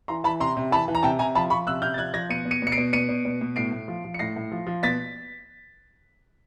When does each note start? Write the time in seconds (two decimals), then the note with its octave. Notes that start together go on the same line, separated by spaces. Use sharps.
0.08 E3 A#5 C6
0.24 E3 A5 B5
0.40 C3 A#5 C6
0.57 C3
0.71 E3 A5 B5
0.88 E3
0.95 A#5
1.03 C3 G5 A5
1.19 C3 G#5 A#5
1.35 F3 A5 B5
1.50 F3 B5 C#6
1.67 C3 E6 F#6
1.82 C3 F6 G6
1.94 A6
1.98 F3 F#6 G#6
2.14 F3 G#6 A#6
2.29 B2 C#7 D#7
2.45 B2
2.51 C#7 D#7
2.62 B2 C#7
2.72 C7 D7
2.78 B2
2.93 B2 C#7 D#7
3.09 B2
3.25 B2
3.41 B2
3.56 A2 C7 D7
3.72 A2
3.88 F3
4.04 F3
4.14 C#7
4.19 A2 A#6 C7
4.36 A2
4.52 F3
4.67 F3
4.83 B2 A6 B6